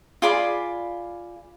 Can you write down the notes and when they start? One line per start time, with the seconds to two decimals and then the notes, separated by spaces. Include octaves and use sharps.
0.22 F4 G#4 D5 B5